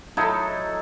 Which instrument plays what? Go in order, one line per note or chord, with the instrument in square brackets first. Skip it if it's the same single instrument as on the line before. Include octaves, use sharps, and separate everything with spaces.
[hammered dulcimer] F#3 D#4 E4 A4